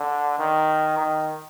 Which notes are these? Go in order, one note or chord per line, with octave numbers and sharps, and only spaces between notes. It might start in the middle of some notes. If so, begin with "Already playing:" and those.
Already playing: D3
D#3
D#3